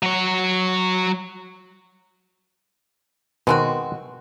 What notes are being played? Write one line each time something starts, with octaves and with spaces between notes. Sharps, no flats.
F#3 C#5
B2 D#3 G#3 C4 F#4